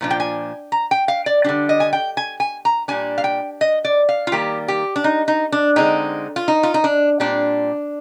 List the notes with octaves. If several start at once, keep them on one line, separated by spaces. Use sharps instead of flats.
A#2 F3 D4
G5
G#5
A#5
G5
F5
D5
D3 G3 D4
D#5
G#5
G5
G#5
G#5
A#5
A#2 G3 D4 G#5
F5
G5
D#5
D5
F5
F4
D#3 G3 A#3 G4
G4
D4
D#4
D#4
D4
D3 G#3 C4 D#4
F4
D#4
F4
D#4
D4
A#2 G3 C4 D4